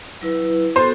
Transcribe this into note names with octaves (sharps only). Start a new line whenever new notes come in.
F#3 E4 B4
B3 F#4 A4 C5